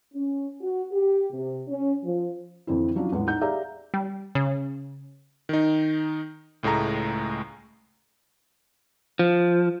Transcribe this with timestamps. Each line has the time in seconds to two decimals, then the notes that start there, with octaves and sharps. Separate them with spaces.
0.13 C#4
0.61 F#4
0.91 G4
1.32 C3
1.68 C#4
2.04 F3
2.67 F2 D3 E3 C4 D4 E4
2.95 F3 F#3 C#4 D4 E4 F4
3.12 E2 A2 E3 G#3 B3
3.27 D#4 F#5 G6
3.41 G4 G#4 D5 E5 F5 A#5
3.94 G3
4.35 C#3
5.49 D#3 D#4
6.63 C#2 A2 G#3 A3 A#5
9.19 F3